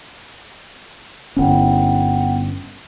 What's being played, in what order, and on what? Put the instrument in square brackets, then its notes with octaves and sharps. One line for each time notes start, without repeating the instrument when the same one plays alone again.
[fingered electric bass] G1 C#4 [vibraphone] B3 F#5 G5